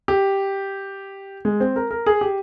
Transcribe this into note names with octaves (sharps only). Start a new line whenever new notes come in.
G4
G#3
C4
A#4
A#4
G#4
G4